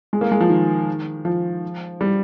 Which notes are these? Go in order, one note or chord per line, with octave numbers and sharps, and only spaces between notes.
G#3
A#3
G#3
F3
D#3
F3
G3